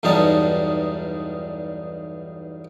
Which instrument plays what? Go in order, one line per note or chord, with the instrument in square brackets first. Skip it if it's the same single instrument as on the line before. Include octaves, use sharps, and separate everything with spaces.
[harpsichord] B1 E2 G2 G3 D#4 A5